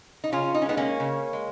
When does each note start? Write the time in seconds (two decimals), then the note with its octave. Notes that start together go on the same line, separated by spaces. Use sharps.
0.24 D#4
0.32 C#3 C#4 F4
0.54 D#4
0.62 C#4
0.66 G#3 B3 D#4
0.77 A#3 C#4
1.00 C#3
1.33 G#3